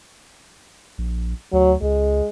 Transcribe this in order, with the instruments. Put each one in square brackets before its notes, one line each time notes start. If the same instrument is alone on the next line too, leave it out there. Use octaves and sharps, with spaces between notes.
[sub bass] A#1
[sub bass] D2 [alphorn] F#3
[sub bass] C#2 [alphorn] G#3